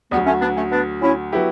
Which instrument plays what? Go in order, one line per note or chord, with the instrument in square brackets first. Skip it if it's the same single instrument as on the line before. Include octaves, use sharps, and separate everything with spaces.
[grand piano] D2 D3 F#3 [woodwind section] G3 B3
[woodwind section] A3 C#4
B3 D4
A3 C#4
B3 D4
C#4 E4
[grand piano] F#3 B3 E4 G4